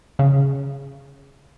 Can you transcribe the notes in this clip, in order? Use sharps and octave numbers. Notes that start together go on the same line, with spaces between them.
C#3